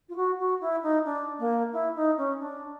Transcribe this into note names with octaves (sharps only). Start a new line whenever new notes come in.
F4
F#4
F#4
E4
D#4
D4
A#3
E4
D#4
C#4
D4